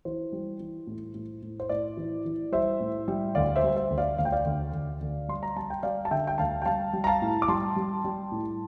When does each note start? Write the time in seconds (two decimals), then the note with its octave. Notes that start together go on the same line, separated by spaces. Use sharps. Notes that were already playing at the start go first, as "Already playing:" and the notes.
0.05 E3 C5
0.32 G3
0.60 E3
0.87 A2
1.14 A2
1.42 A2
1.60 C5
1.69 A2 D5
1.97 E3
2.25 E3
2.52 G3 C5 E5
2.80 A2
3.08 G3
3.35 D2 D5 F5
3.56 C5 E5
3.64 G3
3.76 C5 E5
3.90 D2
3.98 D5 F5
4.18 D2 F5
4.25 G5
4.32 D5 F5
4.45 D2
4.73 D2
5.01 D2
5.28 G3 C6
5.43 A#5
5.56 G3 A5
5.70 G5
5.83 G3 D5 F5
6.05 A5
6.11 D3 E5 G5
6.27 G5
6.38 D2 F5 A5
6.62 G5
6.65 G3 F5 A5
6.93 G3
7.04 A#5
7.07 F5 A5
7.22 A2
7.42 D6
7.48 G3 A5 C6
7.76 G3
8.04 G3
8.32 A2